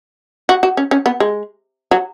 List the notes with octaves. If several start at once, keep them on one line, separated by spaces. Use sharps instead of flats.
F#4
F#4
C#4
C#4
B3
G#3
F#3